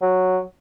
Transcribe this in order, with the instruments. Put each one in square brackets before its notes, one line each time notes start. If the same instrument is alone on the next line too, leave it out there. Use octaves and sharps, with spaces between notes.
[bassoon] F#3